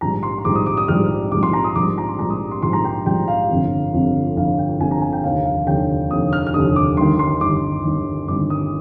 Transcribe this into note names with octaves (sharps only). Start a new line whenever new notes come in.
A#1 G#2 G3 A#5
C6
C6
A#1 G#2 G3 D6
D#6
D6
D#6
A#1 G#2 G3 F6
A#1 G#2 G3 D6
C6
A#5
D#6
A#1 G#2 G3 D6
A#5
C6
A#1 G#2 G3 A#5
D#6
C6
A#1 G#2 G3 C6
A#5
G5
A#1 G#2 G3 G5
F5
G1 F2 C3
G1 F2 C3
G1 F2 C3 F5
G5
G1 F2 C3 G#5
A#5
G#5
G5
F1 D#2 D3 F5
F5
F1 D#2 D3 G5
F1 D#2 D3 D#6
F6
F6
F1 D#2 D3 D#6
D6
G1 G2 D#3 C6
C6
G1 G2 D#3 D6
G1 G2 D#3
G1 G2 D#3 D6
D#6